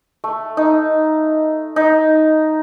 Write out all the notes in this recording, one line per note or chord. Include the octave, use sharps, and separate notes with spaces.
A3
D#4
D#4